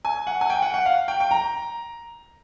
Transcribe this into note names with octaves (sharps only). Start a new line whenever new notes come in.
G#5
F#5
G#5
G5
F#5
F#5
F5
G5
G5
A#5